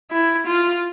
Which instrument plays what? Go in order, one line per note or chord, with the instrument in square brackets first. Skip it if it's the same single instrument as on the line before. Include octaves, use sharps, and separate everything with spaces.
[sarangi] E4
F4